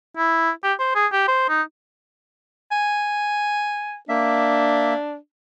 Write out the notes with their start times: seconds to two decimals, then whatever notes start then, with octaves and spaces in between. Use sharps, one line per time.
0.17 E4
0.63 G4
0.79 C5
0.95 G#4
1.12 G4
1.28 C5
1.49 D#4
2.72 G#5
4.09 A#3 D4 E5